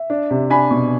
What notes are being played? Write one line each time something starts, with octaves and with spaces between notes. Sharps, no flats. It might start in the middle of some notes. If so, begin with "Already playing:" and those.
Already playing: E5
D4
C3
D4 G#5 B5
B2